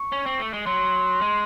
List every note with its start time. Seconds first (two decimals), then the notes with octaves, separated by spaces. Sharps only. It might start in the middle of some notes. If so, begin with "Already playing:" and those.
Already playing: C#6
0.12 C#4
0.26 C4
0.40 A3
0.54 G#3
0.66 F#3 C6
1.21 G#3